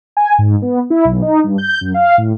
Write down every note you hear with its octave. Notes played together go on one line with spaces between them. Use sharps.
G#5
G#2
B3
E4
B1
D#4
G2
G6
F#2
F5
A2